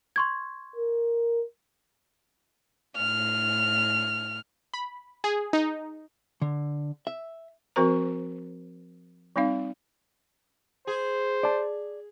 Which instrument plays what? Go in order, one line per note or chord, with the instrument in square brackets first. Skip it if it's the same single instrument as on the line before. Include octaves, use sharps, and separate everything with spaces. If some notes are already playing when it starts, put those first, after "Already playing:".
[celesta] C6 C#6 G#6
[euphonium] A#4
[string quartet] A2 F6
[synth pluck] B5
G#4
D#4
[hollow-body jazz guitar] D3
E5
[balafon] F3 C4 F#4 A#4 C5 A#5
G3 C4 D#4 F5
[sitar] G#4 [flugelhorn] C5
[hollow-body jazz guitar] D5 A5